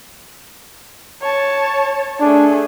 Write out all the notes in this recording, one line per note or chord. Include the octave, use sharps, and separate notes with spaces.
C#5 A5
A3 D4 G#4